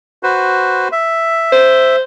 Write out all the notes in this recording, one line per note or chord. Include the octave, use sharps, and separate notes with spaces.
F#4 B4 C5
E5
C5